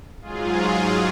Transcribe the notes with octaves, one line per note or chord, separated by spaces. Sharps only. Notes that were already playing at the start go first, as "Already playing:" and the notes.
G#2 F#3 F4 G#4